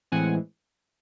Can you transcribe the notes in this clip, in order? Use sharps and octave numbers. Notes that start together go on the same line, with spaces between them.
A2 E3 G#3 C4 F#5 G#5